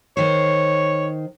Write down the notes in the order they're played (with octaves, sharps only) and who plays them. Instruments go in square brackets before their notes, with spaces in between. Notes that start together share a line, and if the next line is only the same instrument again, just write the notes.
[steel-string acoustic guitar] D#3 C5 [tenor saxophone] C#5